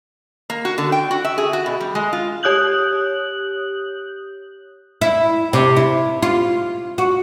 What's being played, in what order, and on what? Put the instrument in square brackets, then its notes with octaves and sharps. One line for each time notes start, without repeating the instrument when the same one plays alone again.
[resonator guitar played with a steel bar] A#3
F#4
D3
G5
F#4
E5
G#4
F#4
B2
G3
G#3
F4
[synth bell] G4 C#5 D#6 F#6 G6 F#7
[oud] E4
C3
E4
F4
F#4